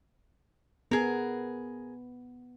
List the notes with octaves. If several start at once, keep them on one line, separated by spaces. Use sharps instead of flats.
B3 G#4 A#4